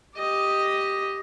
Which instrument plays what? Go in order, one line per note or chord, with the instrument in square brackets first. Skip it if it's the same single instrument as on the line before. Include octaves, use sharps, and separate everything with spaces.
[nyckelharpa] G4 D#5